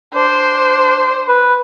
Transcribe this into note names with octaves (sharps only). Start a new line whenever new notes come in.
D4 C5
B4